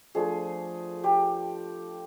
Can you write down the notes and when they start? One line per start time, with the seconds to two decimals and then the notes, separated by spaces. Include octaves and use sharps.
0.15 F3 A3 D4 G#4
1.04 G4